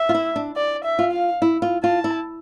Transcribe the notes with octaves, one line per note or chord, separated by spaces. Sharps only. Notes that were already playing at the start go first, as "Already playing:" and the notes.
Already playing: E5
F4
E4
D4
D5
E5
F4
F5
E4
F4
F4 A5
E4